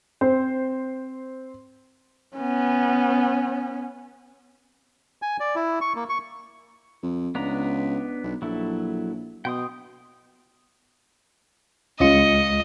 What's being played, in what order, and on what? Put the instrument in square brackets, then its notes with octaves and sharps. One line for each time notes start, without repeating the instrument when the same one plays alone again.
[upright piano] C4 C5
[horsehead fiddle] B3 C#4
[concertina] G#5
D5
E4
C#6
A#3
C#6
[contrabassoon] F2
[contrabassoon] C#2 [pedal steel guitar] B3 D4 A#5
[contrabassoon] B1
[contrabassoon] A#1 [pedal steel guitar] F#3 E4 A4
[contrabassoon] B2 [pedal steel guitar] G5 C6 D#6
[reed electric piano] C#2 G#3 [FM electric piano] C#4 F4 C#7 [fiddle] D#5